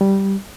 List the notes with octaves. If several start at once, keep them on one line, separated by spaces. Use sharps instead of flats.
G3